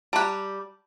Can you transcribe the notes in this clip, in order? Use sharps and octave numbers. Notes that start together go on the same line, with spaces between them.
G3 G4 A5 A#5 F#6